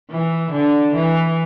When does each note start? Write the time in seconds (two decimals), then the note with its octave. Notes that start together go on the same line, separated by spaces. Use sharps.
0.10 E3
0.52 D3
0.95 E3